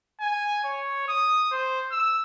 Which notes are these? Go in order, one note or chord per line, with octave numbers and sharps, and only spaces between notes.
G#5
C#5
D#6
C5
E6